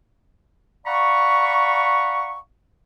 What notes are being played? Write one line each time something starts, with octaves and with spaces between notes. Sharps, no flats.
D5 F5 F#5 A#5 B5 C#6